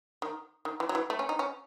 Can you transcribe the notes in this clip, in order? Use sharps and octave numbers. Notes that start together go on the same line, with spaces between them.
D#3
D#3
E3
F#3
E3
A3
C#4
D#4
C#4